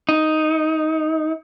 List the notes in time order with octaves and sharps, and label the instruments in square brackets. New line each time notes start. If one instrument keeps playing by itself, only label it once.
[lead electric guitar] D#4